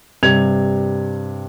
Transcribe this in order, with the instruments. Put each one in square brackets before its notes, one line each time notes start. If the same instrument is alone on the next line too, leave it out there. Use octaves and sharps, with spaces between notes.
[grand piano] G2 C3 G#6 F7